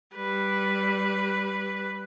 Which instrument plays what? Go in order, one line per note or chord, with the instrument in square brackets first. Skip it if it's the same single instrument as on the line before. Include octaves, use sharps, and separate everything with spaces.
[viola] G3 B4